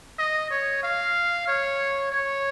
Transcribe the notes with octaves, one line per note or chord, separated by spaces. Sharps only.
D#5
C#5
F5
C#5
C#5